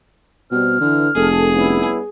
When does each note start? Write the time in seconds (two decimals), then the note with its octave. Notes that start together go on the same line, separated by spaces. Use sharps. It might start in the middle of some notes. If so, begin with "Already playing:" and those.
0.51 B2 G3 C4 F6
0.80 D3 E3
1.15 F1 G#4 A4
1.54 G3 B3 C#4 E4